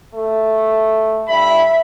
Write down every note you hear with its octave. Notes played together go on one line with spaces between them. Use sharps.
A3
G2 E5 B5